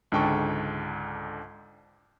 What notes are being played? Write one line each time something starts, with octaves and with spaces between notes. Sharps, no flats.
C#2 G#2 D3 G5 A5 C#6